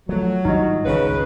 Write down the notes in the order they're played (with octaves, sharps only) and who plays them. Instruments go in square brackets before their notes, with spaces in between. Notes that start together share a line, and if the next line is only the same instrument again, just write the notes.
[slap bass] F3 A3 [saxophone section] F#3
[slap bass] G#1 G2 F3 [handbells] D#4 F#4 D#5
[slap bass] G#1 C#2 [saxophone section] C#3 B4